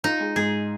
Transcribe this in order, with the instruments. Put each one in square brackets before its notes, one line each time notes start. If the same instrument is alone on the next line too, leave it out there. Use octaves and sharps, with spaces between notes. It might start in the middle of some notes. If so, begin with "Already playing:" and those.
[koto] D#4 [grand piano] F4
[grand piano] G#3
[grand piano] G#2 [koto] G#4